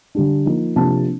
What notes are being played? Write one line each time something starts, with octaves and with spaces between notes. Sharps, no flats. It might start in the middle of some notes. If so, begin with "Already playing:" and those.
D3 G3 D4
F3 A#3 D#4
C3 F3 A#3 D4 A5